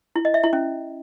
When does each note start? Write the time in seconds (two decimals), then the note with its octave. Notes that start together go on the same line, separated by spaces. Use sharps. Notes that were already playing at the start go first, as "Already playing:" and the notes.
0.16 E4
0.25 D#5
0.34 E5
0.43 E4
0.53 C#4